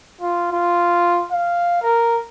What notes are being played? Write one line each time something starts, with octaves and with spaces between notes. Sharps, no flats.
F4
F4
F5
A#4